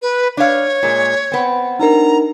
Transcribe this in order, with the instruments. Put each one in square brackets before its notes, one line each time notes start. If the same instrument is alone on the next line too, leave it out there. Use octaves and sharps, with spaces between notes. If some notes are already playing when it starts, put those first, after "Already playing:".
[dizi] B4
[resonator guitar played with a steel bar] D4 F5 [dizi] C#5
[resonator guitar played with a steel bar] A#2 G#3
B3 C4
[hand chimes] D4 D#4 A#4 [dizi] A#5